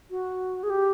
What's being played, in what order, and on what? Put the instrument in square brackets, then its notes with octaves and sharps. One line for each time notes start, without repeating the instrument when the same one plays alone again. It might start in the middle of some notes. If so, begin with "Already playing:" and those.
[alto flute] F#4
G#4
G4